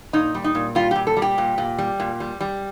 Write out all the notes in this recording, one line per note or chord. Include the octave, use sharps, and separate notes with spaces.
A#2 D#4
G3
D#4
A#2
G3 F4
A#2 G4
A4
G3
G4
A#2
A#2
G3
A#2
G3
G3